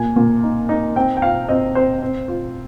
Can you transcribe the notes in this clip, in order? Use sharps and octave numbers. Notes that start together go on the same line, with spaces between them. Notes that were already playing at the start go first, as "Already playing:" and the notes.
Already playing: A#2 G#5
A#2
D#4
D#4
C4 G5
G5
F4 F5
C4 D#5
C4 C5
C4
F4